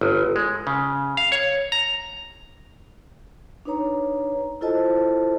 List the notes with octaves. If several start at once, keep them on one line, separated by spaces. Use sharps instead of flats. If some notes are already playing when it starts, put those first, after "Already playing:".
G1
G#3
C#3
F5
C#5
A#5
D4 D#4 B4 C#5 A#5
E4 F4 A4 C5 D#5 A5